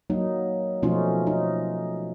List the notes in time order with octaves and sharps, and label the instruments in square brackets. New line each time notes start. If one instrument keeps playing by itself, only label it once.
[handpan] F#3 A#3 D#4
B2 F3 A3 C#4 D#4 F4
D#4